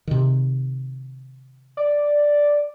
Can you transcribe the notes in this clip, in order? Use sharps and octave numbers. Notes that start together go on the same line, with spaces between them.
C3 D#3
D5